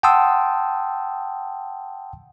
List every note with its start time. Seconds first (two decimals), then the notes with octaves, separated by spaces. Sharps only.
0.03 F#5 G5 A5 C6 D#6 E6